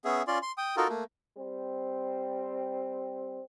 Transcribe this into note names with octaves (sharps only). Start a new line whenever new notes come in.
B3 C#4 G#4 E5
C#4 F4 D5 C6
C6
G5 D#6
D#4 F4 F#4 A4 A#4
A3 A#3
G3 C4